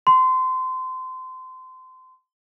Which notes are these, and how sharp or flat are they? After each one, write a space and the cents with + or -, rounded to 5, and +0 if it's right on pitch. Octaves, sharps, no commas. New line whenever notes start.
C6 -25